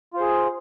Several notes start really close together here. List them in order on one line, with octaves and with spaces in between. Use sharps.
F4 C5 G#4